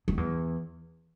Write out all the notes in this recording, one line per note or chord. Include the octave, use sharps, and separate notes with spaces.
F2
E2